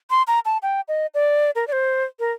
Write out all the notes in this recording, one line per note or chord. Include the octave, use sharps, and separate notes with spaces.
C6
A#5
A5
G5
D#5
D5
A#4
D5
C5
A#4